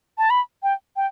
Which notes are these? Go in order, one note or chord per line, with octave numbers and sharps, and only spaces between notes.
A5
B5
G5
G5